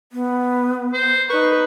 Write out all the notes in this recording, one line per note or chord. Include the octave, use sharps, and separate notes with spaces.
B3
C5
D#4 B4 C#6